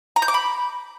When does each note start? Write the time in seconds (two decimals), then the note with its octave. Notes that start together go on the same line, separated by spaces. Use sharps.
0.16 A#5
0.22 G6
0.28 D6
0.34 B5